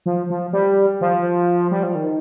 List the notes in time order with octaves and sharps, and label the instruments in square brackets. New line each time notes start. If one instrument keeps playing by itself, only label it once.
[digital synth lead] F3
F3
G3
F3
G3
F3
D#3